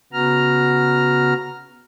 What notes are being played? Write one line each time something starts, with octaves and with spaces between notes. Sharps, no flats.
C#3 B3 F#4 A#5 F6